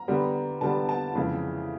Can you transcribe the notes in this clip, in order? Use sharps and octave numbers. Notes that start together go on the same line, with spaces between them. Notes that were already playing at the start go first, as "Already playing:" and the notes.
Already playing: A#5
D3 G3 B3
D3 G3 B3 A5
A5
F2 C#3 E3 G#3